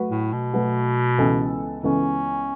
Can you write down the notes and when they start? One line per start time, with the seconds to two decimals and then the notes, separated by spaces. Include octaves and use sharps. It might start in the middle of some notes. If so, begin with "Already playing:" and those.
Already playing: F#3 A3 F#4 B4
0.10 A2
0.33 B2
0.53 F#3 A3 F#4 B4
1.18 C#2 C#3 E3 B3 A4
1.83 C#2 C#3 E3 B3 C#4 A4